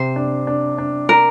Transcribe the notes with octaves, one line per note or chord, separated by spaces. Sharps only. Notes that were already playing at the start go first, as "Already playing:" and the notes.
Already playing: C3 C5
D4
D4
D4
A#4